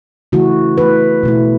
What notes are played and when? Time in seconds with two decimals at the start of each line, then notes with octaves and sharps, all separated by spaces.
0.32 C#3 E3 A3 E4 F#4
0.78 E3 A3 E4 B4
1.23 B2 A3 E4